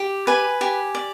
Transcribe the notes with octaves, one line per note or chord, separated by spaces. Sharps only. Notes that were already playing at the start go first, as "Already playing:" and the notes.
Already playing: G4
B4 G#5
G4 G#5
D5